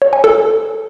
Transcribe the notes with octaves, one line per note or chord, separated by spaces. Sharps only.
C#5
G#5
A4